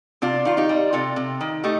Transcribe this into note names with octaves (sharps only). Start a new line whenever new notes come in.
C3 D4 F4
D#3 F4
D#4 G4
G3
C3 F4 A4
C3
D#3
A3 D#4 G4